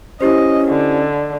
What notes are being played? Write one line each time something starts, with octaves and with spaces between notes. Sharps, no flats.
C#4 E4 G4 C5 D#5
D3